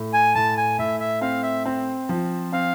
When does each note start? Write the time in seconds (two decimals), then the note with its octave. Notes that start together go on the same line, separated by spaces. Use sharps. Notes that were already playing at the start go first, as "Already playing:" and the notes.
Already playing: A2
0.13 G#5
0.35 A2 A5
0.57 G#5
0.79 A2 E5
1.00 E5
1.21 C4 F5
1.43 E5
1.66 C4
2.09 F3
2.53 C4 F5